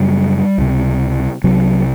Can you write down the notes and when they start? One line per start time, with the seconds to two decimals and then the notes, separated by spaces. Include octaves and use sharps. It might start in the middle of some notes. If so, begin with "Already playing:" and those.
Already playing: F#2 C#3 G3
0.58 C#2 C3
1.44 C2 C3 F#3